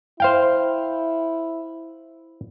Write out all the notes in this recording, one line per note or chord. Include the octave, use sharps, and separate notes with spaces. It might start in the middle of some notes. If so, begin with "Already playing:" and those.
E4 C5 F5 G5